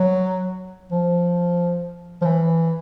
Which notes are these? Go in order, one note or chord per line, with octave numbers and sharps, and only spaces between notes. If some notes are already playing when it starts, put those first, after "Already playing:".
Already playing: F#3
F3
F3
E3